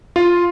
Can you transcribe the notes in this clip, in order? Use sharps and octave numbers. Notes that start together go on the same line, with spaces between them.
F4